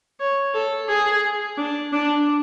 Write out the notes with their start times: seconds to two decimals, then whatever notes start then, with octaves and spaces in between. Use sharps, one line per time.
0.20 C#5
0.54 A4
0.89 G#4
1.58 D4
1.93 D4